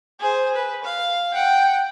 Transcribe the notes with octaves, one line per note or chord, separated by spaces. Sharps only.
G#4 C5
B4
F5
F#5 G5